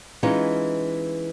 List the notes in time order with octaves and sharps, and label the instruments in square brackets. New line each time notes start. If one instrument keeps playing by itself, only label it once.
[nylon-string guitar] E3 G#3 C#4 D#4 F4